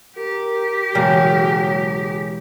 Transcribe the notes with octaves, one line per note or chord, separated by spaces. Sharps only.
G4 A#4
E1 C#3 F#3 G#3 A#3 G5